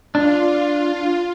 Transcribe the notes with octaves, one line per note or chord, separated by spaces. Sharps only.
D4 F4